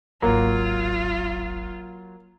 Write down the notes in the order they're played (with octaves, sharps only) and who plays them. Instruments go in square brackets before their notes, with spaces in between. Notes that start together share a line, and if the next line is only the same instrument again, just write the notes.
[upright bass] D1 G#1 [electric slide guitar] F#3 [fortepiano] A#3 [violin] F4